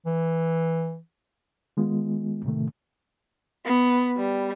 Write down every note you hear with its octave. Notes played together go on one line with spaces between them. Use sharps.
E3
D#3 G#3 B3 F4
A2 C3 D#3 A3
B3
G3